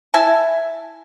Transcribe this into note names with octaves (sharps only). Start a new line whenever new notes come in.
E4 E5 G#5 A5